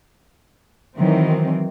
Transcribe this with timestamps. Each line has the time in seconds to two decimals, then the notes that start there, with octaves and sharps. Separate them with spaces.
0.96 D#3 E3 F#3 C4